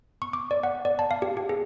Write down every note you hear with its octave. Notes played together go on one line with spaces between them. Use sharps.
C#6
D6
D5
F#5
D5
A5
F5
G4
G4
G#4